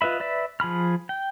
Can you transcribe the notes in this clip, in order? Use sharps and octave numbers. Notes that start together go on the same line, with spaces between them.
F4 B4 D#5 E5 B5
B4 D5 E5
F3 G#4 B5 F6
G5